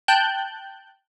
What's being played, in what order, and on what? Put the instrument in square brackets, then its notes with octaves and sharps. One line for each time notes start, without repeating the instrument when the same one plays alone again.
[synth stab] G5 A5 F#6 G6